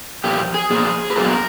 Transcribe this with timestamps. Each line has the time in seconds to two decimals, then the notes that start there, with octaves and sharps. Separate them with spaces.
0.24 A#2 F3 A#3 G4
0.54 G#4
0.70 A#2 F3 A#3 G#4
1.10 B4
1.16 B2 F#3 A#3 D4 F4 A#4